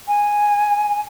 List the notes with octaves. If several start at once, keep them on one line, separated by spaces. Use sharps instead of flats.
G#5